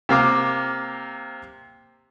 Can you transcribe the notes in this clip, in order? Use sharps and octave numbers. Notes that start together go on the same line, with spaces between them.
C3 A#3 F5 D6